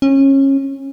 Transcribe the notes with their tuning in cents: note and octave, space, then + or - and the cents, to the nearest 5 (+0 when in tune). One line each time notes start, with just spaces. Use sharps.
C#4 -25